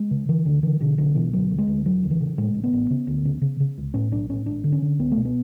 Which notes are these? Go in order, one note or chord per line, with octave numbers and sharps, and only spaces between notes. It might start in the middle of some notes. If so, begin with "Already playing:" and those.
Already playing: G#3
C#3
D3 E3
D2 D3
D3 E3
B2 D3
B1 D3
B2 E3
D2 F#3
D2
G#3
D2
E1 F#3
D2
E3
C#3
A2 G#3
A1
B3
A1
C#3
D2
C#3
C#3
C#3
C#2
A2 C#4
B1 D4
A2 C#4
G#1 D4
D3
C#4
D3
C#2 B3
A3
B2
B3